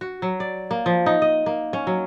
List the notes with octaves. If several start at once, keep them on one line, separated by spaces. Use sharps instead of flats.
F#4
F#3
D5
A#3
F3
D#4
D#5
A#3
C#4
F#3